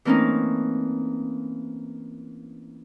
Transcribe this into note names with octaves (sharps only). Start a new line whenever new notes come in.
E3 A3 A#3 C4 C#4 D#4